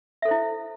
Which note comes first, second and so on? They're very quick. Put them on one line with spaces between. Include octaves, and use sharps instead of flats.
E5 A4 C5 E4